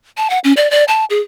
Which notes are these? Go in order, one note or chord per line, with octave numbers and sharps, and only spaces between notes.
A5
F#5
C#4
D5
D5
A5
G#4